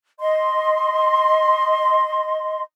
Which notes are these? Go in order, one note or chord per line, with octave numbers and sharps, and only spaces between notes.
D#5 C6